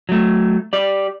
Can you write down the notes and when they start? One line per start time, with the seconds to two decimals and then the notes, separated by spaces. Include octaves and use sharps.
0.09 F#3 A3
0.73 G4 D5